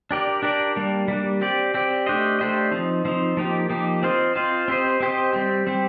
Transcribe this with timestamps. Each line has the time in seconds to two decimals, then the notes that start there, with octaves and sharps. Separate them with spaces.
0.11 D4 G4 A#4 D5
0.43 D4 G4 A#4 D5
0.76 G3 A#3 D4
1.08 G3 A#3 D4
1.41 C4 G4 D5
1.74 C4 G4 D5
2.06 A3 D4 G4 C5 D#5
2.39 A3 D4 G4 C5 D#5
2.71 F3 C4 D#4
3.05 F3 C4 D#4
3.37 F3 A#3 D#4 G4
3.70 F3 A#3 D#4 G4
4.03 C4 F4 C5 D#5
4.36 C4 F4 C5 D#5
4.68 C4 G4 C5 D#5
5.00 C4 G4 C5 D#5
5.33 G3 C4 G4
5.67 G3 C4 G4